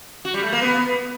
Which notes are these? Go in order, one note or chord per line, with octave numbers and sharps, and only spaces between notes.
F#4
G3
A3
A#3
B3